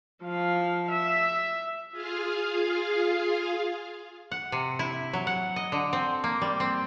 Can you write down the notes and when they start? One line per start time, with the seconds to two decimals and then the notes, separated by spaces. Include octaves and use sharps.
0.23 F3 F5
0.91 E5
1.91 F4 G#4 F5
4.31 F#5
4.52 C3
4.79 E4
5.13 F#3
5.27 F#5
5.56 D#5
5.72 D3
5.93 C4
6.24 A#3
6.42 G3
6.60 C4